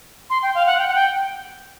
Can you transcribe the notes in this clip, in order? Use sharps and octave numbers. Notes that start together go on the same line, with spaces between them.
C6
G5
F5
F#5
G5
F#5
G5